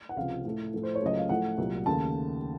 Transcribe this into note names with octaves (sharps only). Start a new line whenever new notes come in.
F#5
C#2 C3 F3 F5
A2 A3
A2 F3 A3
C5
C#5
C#2 C#3 F#3 A3 D#5
F5
A2 F3 A3 F#5
C2 A#2 F#3
D#2 C#3 A3 A5